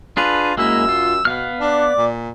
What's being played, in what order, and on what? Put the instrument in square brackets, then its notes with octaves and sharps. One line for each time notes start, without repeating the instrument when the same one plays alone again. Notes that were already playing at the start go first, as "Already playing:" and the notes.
[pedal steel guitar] D4 G#4 B4 [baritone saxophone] F4
[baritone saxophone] F#2 [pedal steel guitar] G#3 A#3 E4 [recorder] E6
[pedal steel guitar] F4
[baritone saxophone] B2 [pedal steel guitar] B3 F5 F6
[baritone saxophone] D4 [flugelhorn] D5 [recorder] D6
[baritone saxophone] A#2